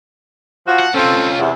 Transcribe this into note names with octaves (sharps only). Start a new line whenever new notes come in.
F3 F#4
F#5
C4 C#4 F4 A4
E2 C3